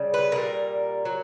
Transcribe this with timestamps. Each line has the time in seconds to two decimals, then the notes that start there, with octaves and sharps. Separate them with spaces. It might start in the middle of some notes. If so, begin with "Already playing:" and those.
Already playing: C#3 G3
0.14 B4
0.32 A#2 G3 A#4
1.05 F#3